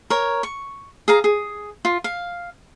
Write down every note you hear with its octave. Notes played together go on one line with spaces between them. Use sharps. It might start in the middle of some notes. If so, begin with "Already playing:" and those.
A#4 C#5
C#6
G#4 F5 A#5
G#4
F4
F5